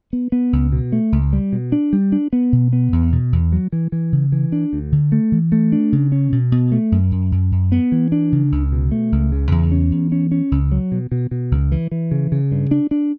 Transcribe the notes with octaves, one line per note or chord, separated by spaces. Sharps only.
B3
B3
C#2
B2
A3
C#2
G3
B2
D4
G3
D4
B3
B2
B3
E2
B2
E2
F#3
E3
E3
C#3
E3
D4
D2
D3
A3
E3
A3
D4
C#3
C#4
B2
B2
A3
F#2
F#2
F#2
F#2
B3
E3
D4
C#3
C#2
B2
A3
C#2
C#3
E2
C#4
E2
C#4
C#4
C#2
F#3
B2
B2
B2
C#2
E3
E3
C#3
C#3
G2
D4
D4